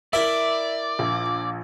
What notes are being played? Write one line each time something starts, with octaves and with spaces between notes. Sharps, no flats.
E4 A#4 D5 E5 B5
A#1